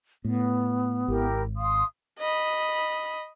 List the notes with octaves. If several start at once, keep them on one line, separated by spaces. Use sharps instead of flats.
A2 B3
G#1 E4 G4 A#4
F5 C6 D#6
D#5 B5